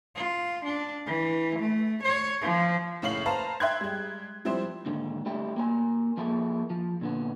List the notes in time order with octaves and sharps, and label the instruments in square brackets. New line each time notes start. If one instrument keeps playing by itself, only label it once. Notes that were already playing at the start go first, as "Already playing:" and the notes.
[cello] F4
D4
E3
A3
C#5
F3
[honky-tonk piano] F#1 A2 C#5 F5 C7 F#7
B4 C5 F5 A5 A#5
E5 G5 C6 F#6 G#6
G3 G#3
F3 G3 C4 E4 C5
[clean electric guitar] D#2 G#2 D3
G3 A3 E4 G4
A#3 A#4 B4 G#5
F3 A#3 E4 G#4 A4
F3
A#2 D3 B3